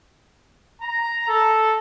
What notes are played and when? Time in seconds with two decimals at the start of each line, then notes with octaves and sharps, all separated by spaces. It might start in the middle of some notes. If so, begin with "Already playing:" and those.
0.82 A#5
1.28 A4